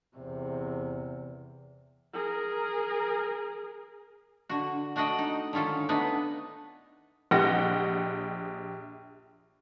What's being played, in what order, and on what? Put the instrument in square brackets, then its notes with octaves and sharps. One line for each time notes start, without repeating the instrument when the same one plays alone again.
[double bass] E2 C3
[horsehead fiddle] G#4 A#4
[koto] D3 F#4
A3 D4 F#4 D#5 F#5 G5
D#4
D3 D#3 C#4 F4 A4
A3 B3 D4 D#4 B4
[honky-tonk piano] A#1 G4 D#5 F#5 A#6 C#7